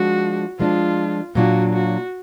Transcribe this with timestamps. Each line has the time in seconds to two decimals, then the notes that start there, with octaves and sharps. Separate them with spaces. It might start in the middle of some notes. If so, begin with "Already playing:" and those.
Already playing: F3 G#3 D4 F#4
0.60 F3 G#3 D4 F4
1.35 A#2 F#3 D4 F4 F#4
1.73 F#4